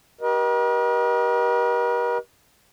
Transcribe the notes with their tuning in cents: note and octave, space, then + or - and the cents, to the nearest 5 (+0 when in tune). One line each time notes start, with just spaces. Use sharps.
G4 -25 A#4 +45 D#5 +0